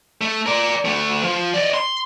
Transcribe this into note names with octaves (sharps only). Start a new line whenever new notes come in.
A3
A#4 D5
D2 A3
F3
D5 D#5
C6